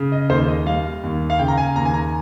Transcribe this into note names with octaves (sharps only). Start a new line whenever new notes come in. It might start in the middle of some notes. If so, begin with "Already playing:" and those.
Already playing: C#3
D#5
D#2 C5
D#5
G3 F5
D#2
F5
C#3 G5
A#5
G#5
D#2 A#5
G#5
A#5